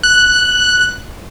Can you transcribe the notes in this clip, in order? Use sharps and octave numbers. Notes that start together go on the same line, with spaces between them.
F#6